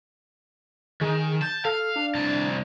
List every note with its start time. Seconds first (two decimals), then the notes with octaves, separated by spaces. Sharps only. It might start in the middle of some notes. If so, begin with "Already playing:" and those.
1.01 D#3 G#4
1.42 A5 G6
1.65 A4 F5
1.96 D4
2.15 C2 A5